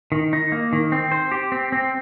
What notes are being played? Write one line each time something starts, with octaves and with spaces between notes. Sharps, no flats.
D#3
D#4
A#3
D#3
C4
C5
G4
C4
C4